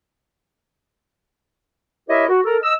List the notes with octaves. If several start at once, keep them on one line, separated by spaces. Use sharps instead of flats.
E4 G4 A#4 C#5 D#5 E5
F#4
A4 A#4
D#5 E6